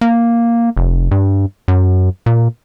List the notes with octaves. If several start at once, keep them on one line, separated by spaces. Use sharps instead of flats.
A#3
F1
G2
F#2
A#2